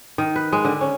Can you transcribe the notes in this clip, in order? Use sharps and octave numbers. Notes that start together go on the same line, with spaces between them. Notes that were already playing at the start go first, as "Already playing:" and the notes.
D#3
B4
G#3
D3
C#4